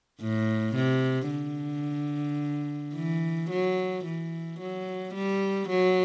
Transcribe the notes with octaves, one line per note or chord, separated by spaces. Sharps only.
A2
C3
D3
E3
F#3
E3
F#3
G3
F#3